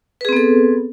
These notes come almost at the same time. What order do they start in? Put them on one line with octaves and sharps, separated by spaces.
B4 G#4 C4 B3 A4